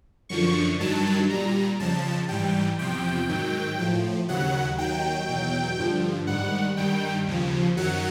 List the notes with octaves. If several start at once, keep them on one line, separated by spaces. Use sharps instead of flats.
F#2 D3 F3 C#6
G2 D#3 F#3 A5
A#2 G3 A#5
F2 C#3 F3 A5
G#2 E3 G3 G5
E2 C3 F3 G5
G#2 D#3 F#3
A2 F3
D#2 C#3 F#3 F#5
D#2 D#3 F#3 G5
E2 B2 F#3
G2 D3 F3
G#2 D#3 G3 F#5
G2 D#3 G3 G5
D#2 C#3 F3
F#2 D#3 F#3 F#5